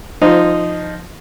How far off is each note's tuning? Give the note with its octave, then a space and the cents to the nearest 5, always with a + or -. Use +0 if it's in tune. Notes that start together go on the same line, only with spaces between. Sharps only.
F3 +0 D#4 -10 C5 -20